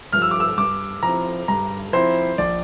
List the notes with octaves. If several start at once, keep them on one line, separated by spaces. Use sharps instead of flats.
G2 F3 F6
E6
D6
E6
G2 D6
F3 C4 E4 A#5
G2 A#5
F3 C4 E4 C5
A#1 D5